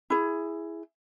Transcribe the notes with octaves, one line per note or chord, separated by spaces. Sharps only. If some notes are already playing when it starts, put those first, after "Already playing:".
E4 G#4